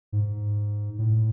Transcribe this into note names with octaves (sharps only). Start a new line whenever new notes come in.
G#2
A2